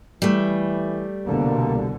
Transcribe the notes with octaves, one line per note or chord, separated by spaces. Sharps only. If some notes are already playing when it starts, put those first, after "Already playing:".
E3 G3 A3
C2 B2 D3 A#3